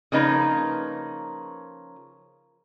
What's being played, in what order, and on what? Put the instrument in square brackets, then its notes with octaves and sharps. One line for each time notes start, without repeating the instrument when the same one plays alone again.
[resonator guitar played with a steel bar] C#3 F3 A#3 D#4 B4